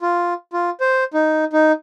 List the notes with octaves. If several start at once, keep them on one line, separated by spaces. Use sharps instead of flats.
F4
F4
C5
D#4
D#4